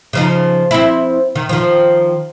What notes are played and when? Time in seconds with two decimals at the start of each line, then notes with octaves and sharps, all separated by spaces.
0.13 C#3 F3 D#4
0.71 C4 E4
1.35 D#3
1.49 D#3 F3